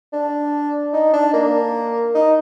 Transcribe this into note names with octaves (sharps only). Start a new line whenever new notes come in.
D4
D#4
D4
A#3
D#4